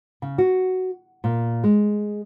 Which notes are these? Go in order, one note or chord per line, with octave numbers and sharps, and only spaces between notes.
C#3
F#4
A#2
G#3